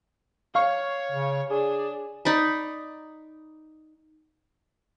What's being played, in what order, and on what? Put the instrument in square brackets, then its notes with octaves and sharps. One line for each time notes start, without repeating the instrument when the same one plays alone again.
[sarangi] C#5 [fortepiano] F5 C#6
[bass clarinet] C#3
[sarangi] D4 [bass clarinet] G#4
[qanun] D#4 D5 B5